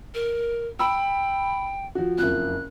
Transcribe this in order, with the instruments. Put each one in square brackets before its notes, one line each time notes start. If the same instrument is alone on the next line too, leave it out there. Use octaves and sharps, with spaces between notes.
[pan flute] A#4
[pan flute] G5 [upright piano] B5 E6
[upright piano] F3 F#4
[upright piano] F#1 F2 [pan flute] F#6